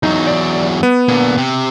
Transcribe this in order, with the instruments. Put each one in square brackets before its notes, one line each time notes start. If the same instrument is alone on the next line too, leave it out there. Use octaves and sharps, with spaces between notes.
[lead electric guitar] E2 F#3 [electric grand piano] D#4
[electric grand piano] D5
B3
[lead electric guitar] A#2 D3
C3